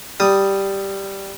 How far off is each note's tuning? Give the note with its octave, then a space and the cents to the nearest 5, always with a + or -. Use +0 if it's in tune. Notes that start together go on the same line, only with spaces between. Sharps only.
G3 +0 D#6 +0